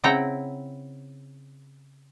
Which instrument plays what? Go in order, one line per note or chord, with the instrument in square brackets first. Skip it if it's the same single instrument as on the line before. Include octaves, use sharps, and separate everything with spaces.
[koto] C#3 C4 E4 F#5 G5 A#5